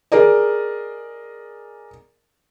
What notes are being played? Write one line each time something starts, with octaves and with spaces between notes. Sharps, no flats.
G#4 A#4 D5 D#5